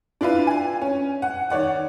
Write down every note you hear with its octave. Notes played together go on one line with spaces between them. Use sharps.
D4 E4 F4 B4
G#5
C#4
F#5
D#3 C#5 D5 F#5